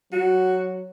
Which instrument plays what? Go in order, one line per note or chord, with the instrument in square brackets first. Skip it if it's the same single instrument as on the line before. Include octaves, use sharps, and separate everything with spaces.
[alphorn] F#3 [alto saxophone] F#4